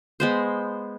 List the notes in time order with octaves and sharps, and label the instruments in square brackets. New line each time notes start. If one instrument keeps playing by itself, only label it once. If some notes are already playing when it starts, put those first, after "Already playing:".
[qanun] G#3 B3 C5